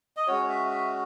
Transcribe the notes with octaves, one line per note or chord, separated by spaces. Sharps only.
D#5
G#3 C#4 F#4 C#5
E5
E5